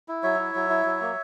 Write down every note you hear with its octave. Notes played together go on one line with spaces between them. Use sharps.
E4
F#3 C#5 E5
E4
F#3
E4
F#3
A#3